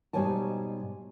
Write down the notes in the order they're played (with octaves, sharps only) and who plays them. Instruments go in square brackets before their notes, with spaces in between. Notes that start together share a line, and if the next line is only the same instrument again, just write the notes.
[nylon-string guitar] G#2 B2 G3 C#5 G#5 A5